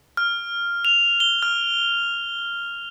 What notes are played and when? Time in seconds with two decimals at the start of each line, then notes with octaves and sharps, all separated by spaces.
0.17 F6
0.85 F7
1.20 G7
1.42 F6